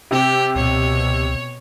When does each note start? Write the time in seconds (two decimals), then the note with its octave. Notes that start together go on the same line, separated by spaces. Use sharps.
0.11 C3 G4
0.55 C#2 B2 C#5